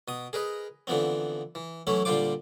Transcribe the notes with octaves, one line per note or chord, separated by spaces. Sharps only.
B2 D#6
G#4 A#4 B4 D#5
D3 E3 F3 B3 C4
E3
E3 F#3 A3 C#4 E4
A#2 D3 G3 F4 C5 D6